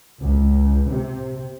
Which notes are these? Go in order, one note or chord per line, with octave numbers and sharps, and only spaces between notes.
C#2
C3